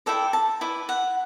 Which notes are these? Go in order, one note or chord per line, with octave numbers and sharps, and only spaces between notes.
E4 A4 D5 G5
A5
E4 B4 D5
F#5